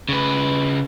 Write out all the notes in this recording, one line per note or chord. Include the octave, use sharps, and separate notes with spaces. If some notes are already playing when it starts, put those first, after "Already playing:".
C#3 B4